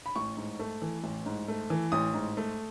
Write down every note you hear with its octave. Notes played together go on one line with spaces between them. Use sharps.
B5
A1 C#6
G#2
A3
E3
A1
G#2
A3
E3
A1 D#6
G#2
A3